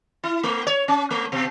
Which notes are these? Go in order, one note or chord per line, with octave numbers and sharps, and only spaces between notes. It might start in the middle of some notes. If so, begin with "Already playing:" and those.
E4
A3
C#5
C#4
A3
B2